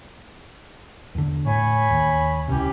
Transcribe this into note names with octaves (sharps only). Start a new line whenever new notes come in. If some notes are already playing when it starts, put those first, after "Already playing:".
E2 D3
A2 C#5 G#5 B5
D#2
C#2 A2 C3 C#4 G4